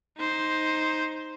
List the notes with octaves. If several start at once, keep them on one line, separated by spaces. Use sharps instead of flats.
D#4 C5